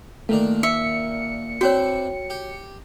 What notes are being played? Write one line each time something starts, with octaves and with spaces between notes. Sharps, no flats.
A#2 D#3 A3 D4
E5 C#7
C4 D4 E4 F#4 C#5 G5
G4